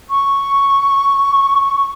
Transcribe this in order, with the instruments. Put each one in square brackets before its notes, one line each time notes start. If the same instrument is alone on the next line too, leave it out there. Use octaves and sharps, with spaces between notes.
[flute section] C#6